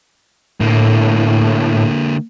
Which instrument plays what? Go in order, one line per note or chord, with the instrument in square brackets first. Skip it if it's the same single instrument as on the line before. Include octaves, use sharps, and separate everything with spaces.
[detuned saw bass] A2 [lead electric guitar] D3 A#3